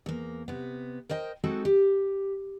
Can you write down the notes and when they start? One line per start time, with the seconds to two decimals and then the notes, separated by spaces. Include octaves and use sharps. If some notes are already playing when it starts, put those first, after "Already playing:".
0.06 E2 A#3
0.48 C3 B3
1.09 A#4 C5 D#5 G5
1.44 G#3 C4 D#4 F#4 A4
1.65 G4